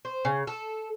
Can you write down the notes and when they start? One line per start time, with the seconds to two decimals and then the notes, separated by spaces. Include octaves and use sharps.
0.05 C5
0.25 C#3
0.47 A4